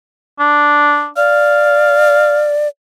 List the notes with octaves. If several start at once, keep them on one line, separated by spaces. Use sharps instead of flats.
D4
D5 F5